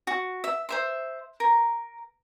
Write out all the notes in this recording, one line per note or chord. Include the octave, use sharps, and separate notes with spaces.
F#4
E5
C5 E5 C6
A#4